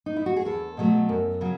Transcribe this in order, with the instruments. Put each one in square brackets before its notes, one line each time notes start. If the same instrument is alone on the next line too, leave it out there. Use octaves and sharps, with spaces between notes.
[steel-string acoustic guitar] D#4
E4
F#4
G#4
E2 A4
B2 F#3 A3
F#2
C#3 F#3